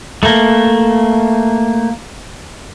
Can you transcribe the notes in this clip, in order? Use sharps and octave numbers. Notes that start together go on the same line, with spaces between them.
A3 A#3